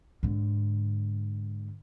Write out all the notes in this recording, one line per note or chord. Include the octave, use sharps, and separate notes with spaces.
G#2 D3